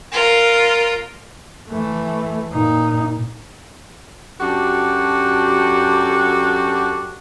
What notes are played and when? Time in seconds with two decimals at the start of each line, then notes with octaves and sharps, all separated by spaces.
0.12 F4 A#4
1.69 E3 A3
2.52 A#2 D#4
4.41 F#2 D4 F#4 G4 A4